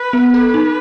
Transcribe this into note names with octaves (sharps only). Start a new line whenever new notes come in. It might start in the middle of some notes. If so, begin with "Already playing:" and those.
Already playing: B4
B3
A4 B4
D#4